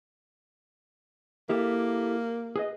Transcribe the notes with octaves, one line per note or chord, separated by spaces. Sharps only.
A#3 E4 G4 A4
G#4 B4 D#5